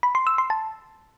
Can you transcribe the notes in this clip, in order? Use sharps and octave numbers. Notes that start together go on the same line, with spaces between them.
B5
C6
E6
C6
A5